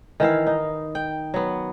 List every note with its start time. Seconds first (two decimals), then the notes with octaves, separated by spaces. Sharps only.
0.20 D#3 E3 E4 F5
0.47 D#4
0.95 G5
1.34 F#3 B3